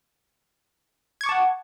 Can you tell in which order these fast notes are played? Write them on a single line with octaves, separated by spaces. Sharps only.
G#6 C#6 D6 A5 F#5